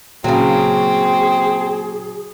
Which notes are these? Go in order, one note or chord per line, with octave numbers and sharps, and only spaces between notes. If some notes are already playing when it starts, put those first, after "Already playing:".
A#2 C#3 F#3 C4 G#4